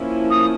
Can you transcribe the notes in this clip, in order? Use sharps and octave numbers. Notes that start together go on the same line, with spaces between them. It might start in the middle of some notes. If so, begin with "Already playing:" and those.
Already playing: F3 A#3 C#4 E4
D#6